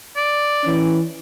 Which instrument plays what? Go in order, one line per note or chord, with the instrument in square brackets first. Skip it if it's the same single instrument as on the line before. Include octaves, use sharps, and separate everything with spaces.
[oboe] D5
[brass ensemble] E3 C#4